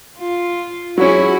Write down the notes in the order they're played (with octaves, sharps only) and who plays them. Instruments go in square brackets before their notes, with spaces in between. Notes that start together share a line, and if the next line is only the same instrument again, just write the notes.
[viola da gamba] F4
[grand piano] F#3 C#4 [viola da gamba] E4 F#4 G#4